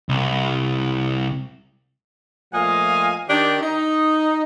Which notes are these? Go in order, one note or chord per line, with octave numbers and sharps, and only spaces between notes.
C2
A#2 F3 A3 D#5 F5 G#5
D#3 D4 G4
D#4